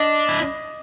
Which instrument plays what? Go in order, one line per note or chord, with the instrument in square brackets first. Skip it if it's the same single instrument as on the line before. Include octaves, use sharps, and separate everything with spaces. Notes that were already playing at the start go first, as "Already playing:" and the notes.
Already playing: [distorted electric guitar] D4 [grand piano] D#5
[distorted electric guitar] E4